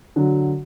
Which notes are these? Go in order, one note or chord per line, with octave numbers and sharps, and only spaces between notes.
D3 F#3